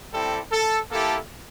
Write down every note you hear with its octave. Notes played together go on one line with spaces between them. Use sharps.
G3 C4 E4 G4 A4
A4
A#3 E4 G4 A4